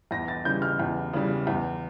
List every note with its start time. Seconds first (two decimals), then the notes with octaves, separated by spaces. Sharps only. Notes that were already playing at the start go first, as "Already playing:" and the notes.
0.11 E2 A#6
0.28 A6
0.45 C#3 E3 G3 G6
0.62 F6
0.79 E2
1.13 C#3 E3 G3
1.47 E2